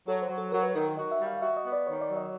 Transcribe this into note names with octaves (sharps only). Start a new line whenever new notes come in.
F#3 A4
C5
F#3
A4
F#3 A#4
B4
D#3 A#4
F#4 D#5
E5
G3
F5
F#4 E5
D#5
B3
D5
D#3 C#5
D5
F#3
D#5